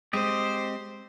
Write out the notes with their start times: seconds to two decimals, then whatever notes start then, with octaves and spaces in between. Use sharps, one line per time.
0.13 G#3 C4 G4 C5 D#5